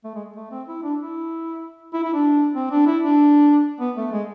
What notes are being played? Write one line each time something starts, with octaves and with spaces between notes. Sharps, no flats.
A3
G#3
A3
C4
E4
D4
E4
E4
E4
D4
C4
D4
E4
D4
B3
A3
G#3